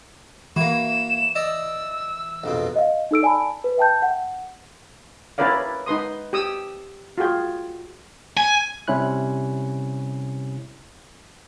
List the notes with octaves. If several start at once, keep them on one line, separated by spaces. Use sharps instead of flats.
E3 A#3 F#4 E7
D5 D#5 E6
A#1 F2 B2
D#5 F5
D#4 A4 E6 D7
D5 G#5 A5 B5
B4
E5 G5 A5 G6
F#5
C#4 E4 A#4 B4 D5 F5
D#4 B4 C6 D#6
G4 D#6 E6
F4 F#4 G#4 G5
G#5
C3 G3 C#4 E4 F#6